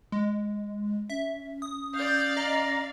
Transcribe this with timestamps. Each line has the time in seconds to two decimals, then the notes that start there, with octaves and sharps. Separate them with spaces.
0.12 G#3
1.10 C#4 E5
1.62 D#6
1.94 D5 F5 G6
2.37 D#5 A#5